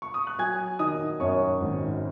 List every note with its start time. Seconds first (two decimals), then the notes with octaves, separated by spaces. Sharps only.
0.02 C#6
0.14 D#6
0.27 F#6
0.38 F#3 G#5 G#6
0.79 D#3 D#5 D#6
1.20 F#2 C#5 C#6
1.61 G#1